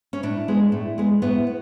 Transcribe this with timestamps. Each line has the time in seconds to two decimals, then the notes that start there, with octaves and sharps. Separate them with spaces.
0.13 C#4
0.23 A2 D4
0.48 G#3 B3
0.72 A2
0.98 G#3 B3
1.22 A2 B3
1.47 B3